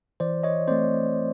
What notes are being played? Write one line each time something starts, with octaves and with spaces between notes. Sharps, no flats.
E3 C5 D5
C#5 D#5
A3 C4 C5 D5